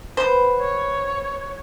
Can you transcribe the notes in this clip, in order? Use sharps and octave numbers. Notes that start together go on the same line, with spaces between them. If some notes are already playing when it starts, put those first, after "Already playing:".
B4 C5 F#5
C#5